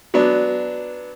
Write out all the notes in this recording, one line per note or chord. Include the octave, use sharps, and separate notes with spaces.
F#3 B3 D4